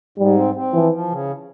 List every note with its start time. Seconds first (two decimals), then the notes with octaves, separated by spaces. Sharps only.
0.18 G#2 G3
0.36 C4
0.55 C4
0.73 E3 F3
0.91 F3
1.10 C#3